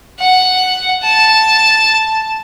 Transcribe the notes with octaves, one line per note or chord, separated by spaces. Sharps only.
F#5
A5